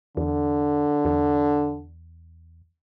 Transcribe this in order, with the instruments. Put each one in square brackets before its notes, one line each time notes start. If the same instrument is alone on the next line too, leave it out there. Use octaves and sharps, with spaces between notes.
[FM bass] E2 [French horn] D3
[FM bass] E2